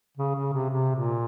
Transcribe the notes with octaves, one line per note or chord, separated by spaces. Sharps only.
C#3
C#3
C3
C3
A#2